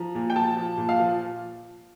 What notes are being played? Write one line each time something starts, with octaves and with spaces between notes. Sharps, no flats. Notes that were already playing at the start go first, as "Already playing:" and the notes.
Already playing: F3 A#5
A#2
G5
F3 A5
F3
A#2
F5
F3